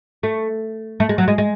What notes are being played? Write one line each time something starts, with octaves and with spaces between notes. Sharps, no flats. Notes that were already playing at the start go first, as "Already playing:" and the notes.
A3
A3
G#3
F#3
G#3
G#3